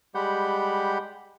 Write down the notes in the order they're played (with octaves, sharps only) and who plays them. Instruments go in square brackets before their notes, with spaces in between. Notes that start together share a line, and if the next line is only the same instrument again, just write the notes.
[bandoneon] G3 G#3 G4 F#5 B5 G6